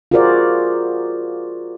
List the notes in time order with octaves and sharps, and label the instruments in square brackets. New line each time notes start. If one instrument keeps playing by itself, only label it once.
[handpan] F4 F#4 G#4 A#4 C5 D5